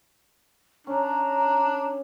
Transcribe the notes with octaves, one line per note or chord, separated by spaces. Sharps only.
C#4 D4 A#5